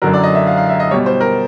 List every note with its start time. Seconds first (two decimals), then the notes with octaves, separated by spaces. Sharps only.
0.02 F#2 D3 F#3 A#4
0.13 D5
0.23 D#5
0.35 E5
0.47 F5
0.57 F5
0.69 E5
0.80 D#5
0.91 G3 C#5
0.94 B2
1.06 C5
1.21 A#4